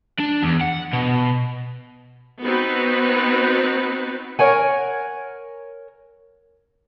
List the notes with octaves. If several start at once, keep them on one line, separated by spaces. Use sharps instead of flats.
D4
E2
F#5
B2
B3 C4 D#4 F#4 B4
A#4 C#5 F#5 G#5